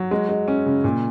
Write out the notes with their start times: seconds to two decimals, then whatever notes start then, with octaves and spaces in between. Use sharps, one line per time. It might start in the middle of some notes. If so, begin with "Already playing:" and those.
Already playing: F#3
0.11 G#3
0.29 G#3
0.48 C#4
0.66 C#3
0.84 A#2